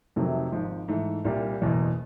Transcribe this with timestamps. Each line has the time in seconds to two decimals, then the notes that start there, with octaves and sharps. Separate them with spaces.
0.16 F2 C3 D#3 F#3 A3
0.52 G#1 G#2 F3
0.88 G#2 E3 A3
1.25 C2 A#2 G3
1.61 F#1 E2 B2